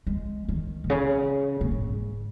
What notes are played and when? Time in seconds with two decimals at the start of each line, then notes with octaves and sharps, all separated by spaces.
0.07 G#3
0.49 D#3
0.84 A#2
0.90 C#3
1.61 A#2
1.72 G#2